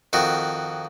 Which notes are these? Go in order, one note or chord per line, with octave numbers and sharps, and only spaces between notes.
F2 D#3 F#4